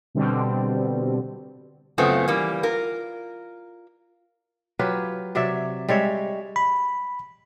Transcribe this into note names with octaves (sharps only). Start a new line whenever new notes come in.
B2 D3 G3 C4
F#2 C#3 A3 B3 C4 F4
E3 G3 A#3
F4 A#4
F#3 F4 G4 B4
C3 F#3 D5 E5
G3 G#3 C#5 E5
B5